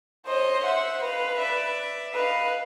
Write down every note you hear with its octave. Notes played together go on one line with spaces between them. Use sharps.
C5 C#5 D#5
C5 E5 F#5
B4 D#5 F5
D5 E5
B4 D#5 F5